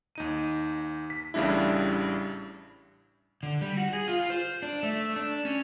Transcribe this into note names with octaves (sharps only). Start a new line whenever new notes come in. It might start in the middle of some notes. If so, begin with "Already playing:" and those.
D#2 D#4 D#7
B6
A1 A2 C#3 G3 D4 E4
D3
G3
F#4
G#4
F4
C5
D4
A3
D4
C#4